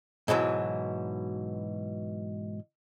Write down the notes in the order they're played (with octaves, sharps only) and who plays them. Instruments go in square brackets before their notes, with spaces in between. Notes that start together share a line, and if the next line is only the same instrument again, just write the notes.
[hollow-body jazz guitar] G#2 B2 E3 F#3